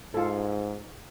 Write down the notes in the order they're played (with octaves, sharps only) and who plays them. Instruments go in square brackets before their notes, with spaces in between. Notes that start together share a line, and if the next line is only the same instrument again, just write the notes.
[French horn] G#2 [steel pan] F4 A4